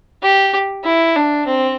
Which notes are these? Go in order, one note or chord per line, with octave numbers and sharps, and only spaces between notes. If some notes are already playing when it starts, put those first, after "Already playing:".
G4
E4
D4
C4